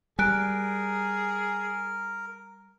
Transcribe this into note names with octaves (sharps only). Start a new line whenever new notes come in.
G3 G#4 A#4 G#5 F#6 D7